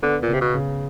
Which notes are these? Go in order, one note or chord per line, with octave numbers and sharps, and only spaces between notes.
D3 B3
A#2
C#3
C3
B2
C#3